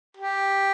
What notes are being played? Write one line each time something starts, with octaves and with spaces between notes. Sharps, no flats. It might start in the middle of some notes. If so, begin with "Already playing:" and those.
G4